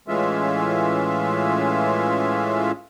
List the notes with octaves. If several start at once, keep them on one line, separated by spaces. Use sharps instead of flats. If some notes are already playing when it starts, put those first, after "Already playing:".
A2 E3 G#3 C#4 F4 E5